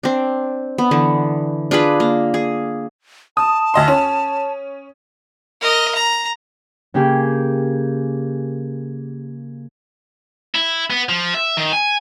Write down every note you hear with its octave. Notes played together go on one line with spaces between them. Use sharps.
C4 D4
B3
D3 E3
D4 F4 G#4 B4
A#3
G#4
A5 D#6
D2 D#5 C6
C#4
A#4 D#5
A#5
C#3 A#3 G4 G#4 G5
E4
B3
F3
E5
D#3
G#5